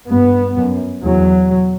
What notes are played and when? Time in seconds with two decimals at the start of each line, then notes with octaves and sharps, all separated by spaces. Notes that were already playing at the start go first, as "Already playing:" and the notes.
0.09 G2 B3
0.57 F#2
1.03 E2 B2 F#3